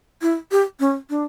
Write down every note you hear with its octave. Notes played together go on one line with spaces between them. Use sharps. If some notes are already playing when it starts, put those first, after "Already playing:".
E4
G4
C#4
D4